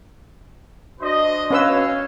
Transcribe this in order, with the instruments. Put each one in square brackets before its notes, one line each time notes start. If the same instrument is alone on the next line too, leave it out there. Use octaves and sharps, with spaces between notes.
[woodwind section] D4 F#4 [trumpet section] C5 D#5
[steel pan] C#4 B4 E6 [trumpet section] C#5 F5